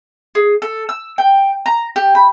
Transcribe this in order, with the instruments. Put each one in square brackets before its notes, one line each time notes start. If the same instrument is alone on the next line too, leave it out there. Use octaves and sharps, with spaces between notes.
[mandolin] G#4
A4
E6
G5
A#5
G4
B5